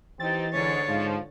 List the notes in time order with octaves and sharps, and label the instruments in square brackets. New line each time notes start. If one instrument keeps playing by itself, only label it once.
[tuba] E3 [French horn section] C4 D#4 G4 [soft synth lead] A6
[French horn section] G#2 [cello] D3 C#5
[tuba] G#2 [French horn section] F3